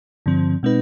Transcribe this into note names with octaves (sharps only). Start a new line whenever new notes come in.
G2 D3 F3 C4
B2 G#3 C4 D#4 B4